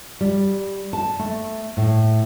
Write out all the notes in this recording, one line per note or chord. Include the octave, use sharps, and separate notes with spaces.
G3
A5
A3
A2